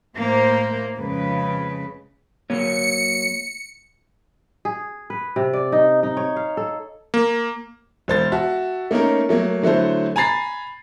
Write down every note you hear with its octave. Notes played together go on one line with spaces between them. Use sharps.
A2 A#3 C5
F2 C#3 G#3 B4
F#3 A#3 C#5 C#7
G#4
B4
C3
D5
D#4
D#4
C#5
F5
A4
A#3
E1 C5 A6
F#4 E5 A5
A3 A#3 C#4 D#4 A#4
F#3 A3 A#3
D3 F#3 A3 E4 A4 C5
G#5 A#5 B5 A6 C7